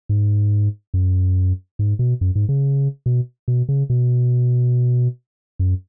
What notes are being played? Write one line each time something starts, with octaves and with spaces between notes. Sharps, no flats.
G#2
F#2
G#2
B2
F#2
G#2
C#3
B2
B2
C#3
B2
F#2